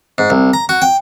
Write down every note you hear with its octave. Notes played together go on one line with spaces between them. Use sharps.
G#2
C2
A#5
F#4
G5